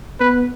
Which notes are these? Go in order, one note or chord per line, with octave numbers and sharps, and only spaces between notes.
B3 B4